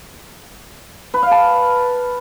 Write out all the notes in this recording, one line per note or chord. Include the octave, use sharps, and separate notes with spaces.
B4
F5
A5